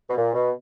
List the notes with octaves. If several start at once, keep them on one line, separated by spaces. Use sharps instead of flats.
B2
A#2
B2